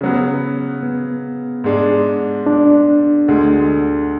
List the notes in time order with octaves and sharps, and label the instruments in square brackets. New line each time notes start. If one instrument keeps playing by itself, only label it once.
[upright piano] C#3 F#3 B3
[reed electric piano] B3
[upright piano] G#2 G#3 D4
[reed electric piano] D4
[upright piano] D2 D3 G#3